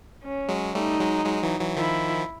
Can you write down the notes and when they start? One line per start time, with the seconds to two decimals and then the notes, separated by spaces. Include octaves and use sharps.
0.24 C#4
0.49 F#3 G#3
0.75 G3 A3 D#4
1.00 F#3 G#3
1.26 F#3 G#3
1.43 E3 F#3
1.60 E3 F#3
1.77 D#3 F3 E4